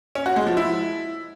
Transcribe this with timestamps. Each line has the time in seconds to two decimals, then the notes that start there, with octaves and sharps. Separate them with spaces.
0.15 C#4
0.26 F#4
0.36 G#3
0.46 F3
0.57 E4